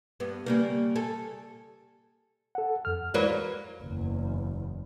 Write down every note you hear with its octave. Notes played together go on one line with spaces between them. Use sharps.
G2 B3
C#3 G3 A#3
G#4 A4
A4 F#5
F2 F6
E3 F#3 G#3 A#3 C5 D5
F#1 E2